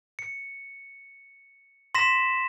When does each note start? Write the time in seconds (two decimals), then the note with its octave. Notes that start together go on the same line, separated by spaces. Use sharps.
0.19 C#7
1.95 C6 A#6 B6 E7